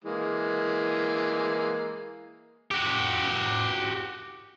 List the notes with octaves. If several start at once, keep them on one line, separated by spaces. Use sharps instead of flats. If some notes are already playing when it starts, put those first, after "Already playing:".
E3 G#3 A#3
F#4 G4